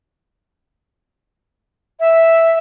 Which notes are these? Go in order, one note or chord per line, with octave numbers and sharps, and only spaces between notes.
E5